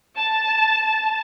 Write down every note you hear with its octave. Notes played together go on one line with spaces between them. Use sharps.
A5
A5